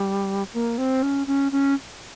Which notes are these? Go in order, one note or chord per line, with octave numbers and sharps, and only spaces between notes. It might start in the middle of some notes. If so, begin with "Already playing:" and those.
Already playing: G3
A#3
C4
C#4
C#4
C#4